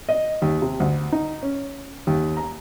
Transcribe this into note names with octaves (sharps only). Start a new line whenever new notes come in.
D#5
D#2
C3
D2
D#4
C#4
D#2
A#5